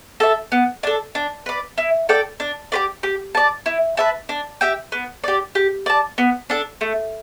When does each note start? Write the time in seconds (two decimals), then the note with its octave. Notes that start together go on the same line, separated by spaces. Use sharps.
0.20 A4 E5
0.52 B3
0.83 D4 A4
1.15 D4
1.46 B4 D5
1.78 E4
2.09 A4 D5 G5
2.40 D4
2.72 G4 B4 D5
3.03 G4
3.35 D5 A5
3.66 E4
3.97 B4 E5 A5
4.29 D4
4.61 G4 E5 G5
4.92 B3
5.24 G4 D5
5.55 G4
5.86 D5 A5
6.18 B3
6.50 D4 A4
6.81 A3